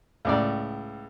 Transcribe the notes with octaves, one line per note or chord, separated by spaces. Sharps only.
C#2 A2 D5